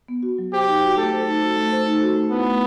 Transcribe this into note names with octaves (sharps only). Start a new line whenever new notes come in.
B3
F#4
F#3
G4 C5
D#4
F#4
A3 A4
C5
D#4
F#4
A3
C5
D#4
F#4
A3
B3 E4
A3